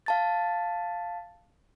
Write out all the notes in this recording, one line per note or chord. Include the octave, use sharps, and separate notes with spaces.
F5 A5 A6